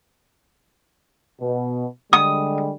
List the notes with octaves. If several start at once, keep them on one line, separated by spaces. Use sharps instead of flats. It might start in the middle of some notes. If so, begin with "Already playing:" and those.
B2
D3 G3 G#3 D#6